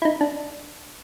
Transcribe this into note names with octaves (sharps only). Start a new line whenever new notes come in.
E4
D#4
D4